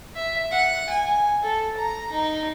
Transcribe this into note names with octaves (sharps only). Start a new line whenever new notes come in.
E5
F#5
G#5
A4
A#5
D#4